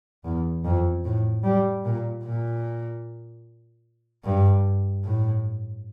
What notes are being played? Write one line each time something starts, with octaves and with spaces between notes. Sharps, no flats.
E2
F2
A2
G3
A#2
A#2
G2
A2